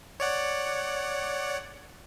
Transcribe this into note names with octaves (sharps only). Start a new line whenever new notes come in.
C#5 D5 F#5